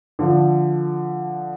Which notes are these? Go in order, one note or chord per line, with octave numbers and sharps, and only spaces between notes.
D3 F3